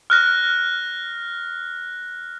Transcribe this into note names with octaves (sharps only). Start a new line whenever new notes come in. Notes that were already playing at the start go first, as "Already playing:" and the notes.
F6 F#6 A#6